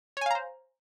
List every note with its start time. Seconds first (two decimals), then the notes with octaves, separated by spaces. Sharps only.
0.17 C#5
0.21 G#5
0.26 F5
0.31 A#5
0.35 C5